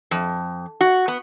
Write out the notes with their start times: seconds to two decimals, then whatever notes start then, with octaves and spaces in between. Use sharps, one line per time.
0.11 F2
0.81 F#4
1.08 B3